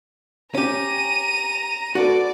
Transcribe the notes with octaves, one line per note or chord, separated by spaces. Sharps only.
C#4 G4 A#5 D#7
F#4 A4 B4 D5